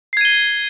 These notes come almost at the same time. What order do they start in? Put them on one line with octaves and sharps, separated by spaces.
C7 G#6 D#7 G7